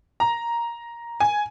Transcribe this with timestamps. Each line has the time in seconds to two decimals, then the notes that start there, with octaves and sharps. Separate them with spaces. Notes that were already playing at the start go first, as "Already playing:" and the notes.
0.20 A#5
1.20 G#5